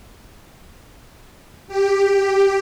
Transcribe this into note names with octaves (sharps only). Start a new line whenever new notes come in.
G4